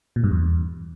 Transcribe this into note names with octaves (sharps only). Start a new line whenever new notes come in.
A#2
G2
E2